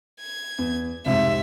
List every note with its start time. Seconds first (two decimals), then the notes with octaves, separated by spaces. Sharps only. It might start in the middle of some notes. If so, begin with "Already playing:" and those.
0.20 G#6
0.58 E2
1.06 C2 F2 G#2 C3 E5